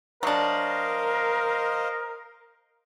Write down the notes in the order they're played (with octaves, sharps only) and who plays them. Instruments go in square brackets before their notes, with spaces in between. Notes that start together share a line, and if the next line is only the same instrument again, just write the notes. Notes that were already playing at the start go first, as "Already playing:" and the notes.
[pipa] F#3 D4 [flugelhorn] A#4 [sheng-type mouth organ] C5 D#5 F5